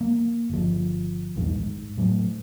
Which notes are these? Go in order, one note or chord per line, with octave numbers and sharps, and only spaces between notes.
A#3
G1 F3
A#1 E2 G2 D#3
G#2
A2 F#3 G#3 A3